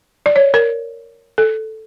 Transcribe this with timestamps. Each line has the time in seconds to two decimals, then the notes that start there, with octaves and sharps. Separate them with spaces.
0.26 D5
0.36 C#5
0.54 A#4
1.38 A4